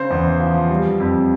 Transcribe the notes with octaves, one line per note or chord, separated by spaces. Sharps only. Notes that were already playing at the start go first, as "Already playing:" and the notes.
Already playing: C#3 C5
E2
F3
G3
F2